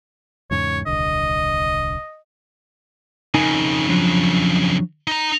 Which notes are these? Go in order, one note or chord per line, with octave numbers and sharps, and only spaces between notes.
E2 G#2 C#3 C#5
D#1 C2 D3 D#5
F2 C#3 D#4 A#4 G#5
F3 F#3 D4
D#4 A#5